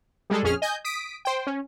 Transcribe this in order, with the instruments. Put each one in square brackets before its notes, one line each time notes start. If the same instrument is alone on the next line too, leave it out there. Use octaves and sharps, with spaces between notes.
[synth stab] G3 G#3 G#4 A4
A#1 F2 C#4 G#4 F6
D#5 G#5 G6
D#6 B6 D7
C5 G5
C#4